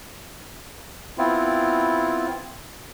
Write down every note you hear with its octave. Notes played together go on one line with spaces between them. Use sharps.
B3 C4 E4 F4